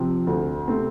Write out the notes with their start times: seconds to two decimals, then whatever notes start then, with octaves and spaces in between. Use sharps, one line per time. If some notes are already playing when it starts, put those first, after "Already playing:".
Already playing: C3 F3 C4
0.27 D2
0.68 C3 A3 C4